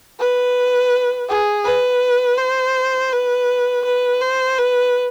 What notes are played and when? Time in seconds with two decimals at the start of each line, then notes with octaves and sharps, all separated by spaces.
0.19 B4
1.29 G#4
1.64 B4
2.38 C5
3.12 B4
3.85 B4
4.21 C5
4.58 B4